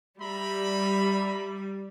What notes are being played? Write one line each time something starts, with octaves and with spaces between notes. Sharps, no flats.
G3 E5 A#5 B5